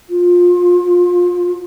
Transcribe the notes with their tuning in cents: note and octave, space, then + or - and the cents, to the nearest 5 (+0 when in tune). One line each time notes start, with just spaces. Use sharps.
F4 +25